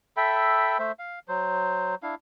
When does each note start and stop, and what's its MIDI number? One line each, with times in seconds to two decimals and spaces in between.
0.17 0.78 69
0.17 0.78 76
0.17 0.78 79
0.17 0.78 83
0.79 0.92 57
0.79 0.92 72
0.79 0.92 76
0.99 1.19 77
1.28 1.95 54
1.28 1.95 72
2.03 2.15 62
2.03 2.15 64
2.03 2.15 77